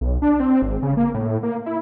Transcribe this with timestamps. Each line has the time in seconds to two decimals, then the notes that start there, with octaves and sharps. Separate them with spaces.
0.01 B1
0.22 D4
0.40 C4
0.62 G#1
0.83 C#3
0.97 A#3
1.14 A2
1.43 A#3
1.66 E4